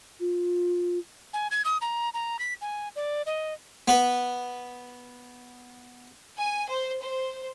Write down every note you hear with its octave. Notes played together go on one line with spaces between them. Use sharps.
F4
G#5
G#6
D#6
A#5
A#5
B6
G#5
D5
D#5
B3 B4
G#5
C5
C5